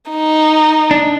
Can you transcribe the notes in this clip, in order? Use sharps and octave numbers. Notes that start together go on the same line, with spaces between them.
D#4
D4